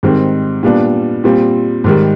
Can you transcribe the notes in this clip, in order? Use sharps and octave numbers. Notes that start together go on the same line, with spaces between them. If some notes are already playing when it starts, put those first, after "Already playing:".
G#2 D#3 G3 C4
A#2 G3 B3 D4
A#2 G3 C4
G#2 D#3 G3